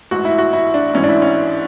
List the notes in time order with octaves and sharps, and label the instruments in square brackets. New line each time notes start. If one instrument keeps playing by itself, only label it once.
[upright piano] A1 G#2 E3 F#4
E4
F#4
E4
D4
A1 G#2 E3 C#4
D4
E4
C#4